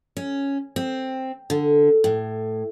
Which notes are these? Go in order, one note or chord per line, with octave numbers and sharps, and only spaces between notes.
C#4
C4
D3
A2